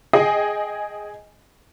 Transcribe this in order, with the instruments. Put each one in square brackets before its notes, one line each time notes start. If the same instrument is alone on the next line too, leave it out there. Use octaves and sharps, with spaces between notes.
[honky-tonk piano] G#4 D#5 G5 G#5 C7